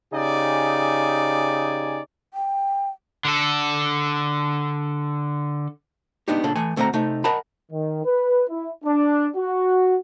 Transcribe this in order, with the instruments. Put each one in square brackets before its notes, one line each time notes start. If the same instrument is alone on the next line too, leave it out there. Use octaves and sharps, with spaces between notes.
[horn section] C#3 D#4 G4 D5 G#5
[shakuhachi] G5
[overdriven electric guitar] D3 A4
[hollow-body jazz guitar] B3 D4 D#4 G4
A#2 C#3 D4 A4
E3 A3 G#5
D2 A3 C4 D#5 F#5 A#5
C3 A3 D#4
A#4 D#5 F#5 A5 B5
[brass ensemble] D#3
B4
E4
D4
F#4